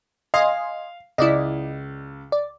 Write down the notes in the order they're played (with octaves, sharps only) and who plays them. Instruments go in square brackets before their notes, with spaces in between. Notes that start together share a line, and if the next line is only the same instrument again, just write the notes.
[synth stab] D#5 G#5 C6 [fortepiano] F5
[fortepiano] C#2 [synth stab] E4 D5 D#5
[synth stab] D5